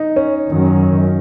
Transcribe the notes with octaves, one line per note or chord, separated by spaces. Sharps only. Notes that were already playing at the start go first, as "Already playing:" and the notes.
Already playing: D#4
C#4
F#2 D#3 F#3 C#4